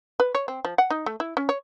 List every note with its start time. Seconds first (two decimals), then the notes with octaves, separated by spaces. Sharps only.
0.20 B4
0.35 C#5
0.48 C4
0.65 F3
0.78 F#5
0.90 D#4
1.06 A3
1.20 E4
1.37 C#4
1.49 C#5